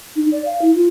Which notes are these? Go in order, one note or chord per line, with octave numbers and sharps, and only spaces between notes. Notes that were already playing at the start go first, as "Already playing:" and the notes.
D#4
D5
F5
E4
F4